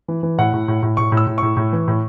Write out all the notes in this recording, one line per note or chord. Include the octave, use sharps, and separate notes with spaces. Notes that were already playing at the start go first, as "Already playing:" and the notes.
E3
E3
A2 F#5
A2
A2
A2
A2 C#6
A2
E6
A2
A2 C#6
A2
E3
A2